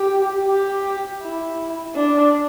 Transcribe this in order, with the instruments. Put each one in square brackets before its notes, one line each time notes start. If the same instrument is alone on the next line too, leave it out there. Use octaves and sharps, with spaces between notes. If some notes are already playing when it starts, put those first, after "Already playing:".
Already playing: [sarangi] G4
G4
E4
D4